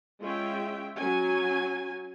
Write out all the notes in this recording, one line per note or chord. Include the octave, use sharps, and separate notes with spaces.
G#3 C#4 F4 E5 G5
F#3 C#4 G#5